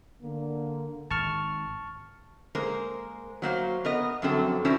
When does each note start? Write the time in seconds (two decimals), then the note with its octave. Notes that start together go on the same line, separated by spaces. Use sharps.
0.23 D3 A#3
1.11 G#1 A5 C#6 F6
2.55 G#3 A#3 A#4 C5
3.42 F#3 A#3 C5 F5
3.85 B3 A#4 D#5
4.22 F#2 D3 F3 F#3 C4 A4
4.65 C#4 D4 E4 F#4 A#4 C5